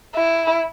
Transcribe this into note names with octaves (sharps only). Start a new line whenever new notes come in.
E4